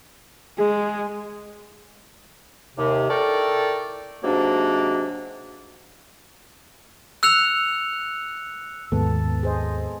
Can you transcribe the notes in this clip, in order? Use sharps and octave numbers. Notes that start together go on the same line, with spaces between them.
G#3 G#4
D#2 C3
E4 A4 A#4 D5 G5 C#6
G#2 C3 F#3 A#3 D4
E6 F#6 C#7 F7
D#2 G#2 B3 A4
G#4 C5 D#5